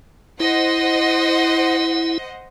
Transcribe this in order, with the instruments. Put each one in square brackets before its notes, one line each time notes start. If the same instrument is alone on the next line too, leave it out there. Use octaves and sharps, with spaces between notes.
[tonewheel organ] E4 [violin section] C5 D#5 F#5